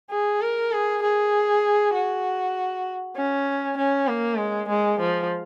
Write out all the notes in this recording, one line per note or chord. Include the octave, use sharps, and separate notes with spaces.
G#4
A#4
G#4
G#4
F#4
C#4
C#4
A#3
G#3
G#3
F3